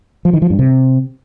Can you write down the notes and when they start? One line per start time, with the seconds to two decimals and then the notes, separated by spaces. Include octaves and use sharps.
0.25 F3
0.33 D#3
0.42 F3
0.50 G2
0.59 C3